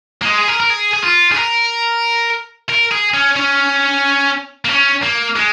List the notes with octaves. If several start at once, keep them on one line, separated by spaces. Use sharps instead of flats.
A#3
G#3
G#4
A#4
A#4
G#4
G#4
F4
G#4
A#4
A#4
G#4
C#4
C#4
A#3
C#4
A#3
G#3